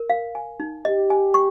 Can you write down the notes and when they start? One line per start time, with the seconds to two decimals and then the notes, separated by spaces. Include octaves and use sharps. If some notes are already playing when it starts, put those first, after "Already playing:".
Already playing: A#4
0.10 F5
0.35 G#5
0.60 D#4
0.85 G4 D#5
1.10 G#5
1.34 C#6